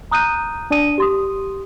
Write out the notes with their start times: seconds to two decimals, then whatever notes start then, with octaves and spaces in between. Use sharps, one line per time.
0.11 A#5 D#6 F#6 G6 D#7
0.70 D4 D5 A5 D#6 D#7
0.98 G4 C6 D#6